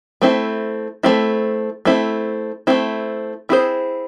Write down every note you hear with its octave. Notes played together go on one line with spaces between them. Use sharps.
A3 C4 E4
A3 C4 E4
A3 C4 E4
A3 C4 E4
C4 E4 G#4 C5